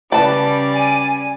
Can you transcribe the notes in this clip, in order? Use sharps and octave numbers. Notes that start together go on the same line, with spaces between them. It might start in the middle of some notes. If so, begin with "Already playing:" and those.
C#3 G3 B4 D5 A5
G#5